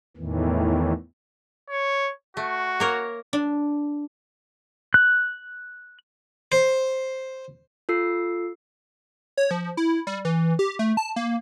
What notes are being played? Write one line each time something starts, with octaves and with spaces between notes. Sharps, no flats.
E2 A2 D#3 E3
C#5
A3 F#4
A#3 A#4 C#5
D4
F#6
C5
F4 A4 E6 C7
C#5
F3
E4
G3
E3
G4
A3
A5
A#3